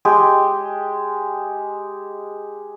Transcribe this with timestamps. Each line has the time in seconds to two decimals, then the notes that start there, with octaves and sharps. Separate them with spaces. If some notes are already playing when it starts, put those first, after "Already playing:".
0.05 G#3 G4